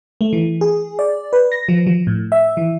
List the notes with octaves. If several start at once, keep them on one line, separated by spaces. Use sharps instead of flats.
A3
E3
G#4
D5
B4
A#6
F3
F3
A2
E5
E3